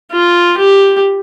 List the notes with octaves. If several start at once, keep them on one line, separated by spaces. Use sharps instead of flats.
F4
G4